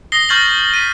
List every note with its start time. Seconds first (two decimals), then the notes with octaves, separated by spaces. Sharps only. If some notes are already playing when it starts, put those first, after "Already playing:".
0.12 D#6 A#6 C7 G7
0.29 C#6 F6 G6 A6 C7 F#7
0.71 B6 D#7 F#7